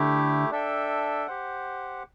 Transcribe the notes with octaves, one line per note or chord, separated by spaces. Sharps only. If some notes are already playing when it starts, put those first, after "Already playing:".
Already playing: D3 A3 E4 G4
D4 A4 E5 G5
G4 C5 F#5